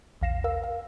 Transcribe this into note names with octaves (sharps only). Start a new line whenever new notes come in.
A#1 E2 F5 A#6 C7 E7
A#4 F5 E6
F5